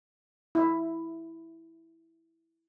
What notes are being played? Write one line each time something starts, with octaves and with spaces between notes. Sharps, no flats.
E4 E5